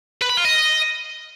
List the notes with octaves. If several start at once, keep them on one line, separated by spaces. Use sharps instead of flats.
B4
B5
F4
D#5